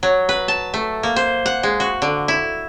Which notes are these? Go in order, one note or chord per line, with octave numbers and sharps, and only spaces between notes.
F#3
B4
A5
A3
A#3
C5
F#5
G#3
F#4
D3
E4